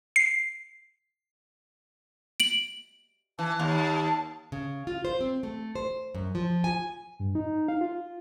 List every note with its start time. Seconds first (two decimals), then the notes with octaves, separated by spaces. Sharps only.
0.16 C7
2.40 D7 F#7
3.39 E3 A5
3.59 D#2
4.52 C#3
4.87 F4
5.05 C5
5.21 C4
5.43 A3
5.75 C5
6.15 F#2
6.35 F3
6.64 G#5
7.20 G2
7.35 D#4
7.68 F5
7.81 F4